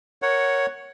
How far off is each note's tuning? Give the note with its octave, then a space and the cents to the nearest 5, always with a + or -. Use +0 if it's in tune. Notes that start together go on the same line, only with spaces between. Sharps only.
A#4 +0 C#5 +0 F#5 +5